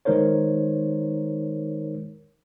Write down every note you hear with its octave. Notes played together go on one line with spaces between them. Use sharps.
D#3 G#3 D#4 A#4 C5 C#5